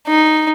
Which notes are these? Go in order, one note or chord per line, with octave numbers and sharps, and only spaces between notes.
D#4